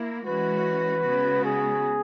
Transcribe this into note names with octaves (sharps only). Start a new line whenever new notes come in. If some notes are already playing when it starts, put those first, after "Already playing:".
Already playing: A#3 E4
E3 G#3 C#4 F#4 B4
C#3 G#3 B3 F#4
G#4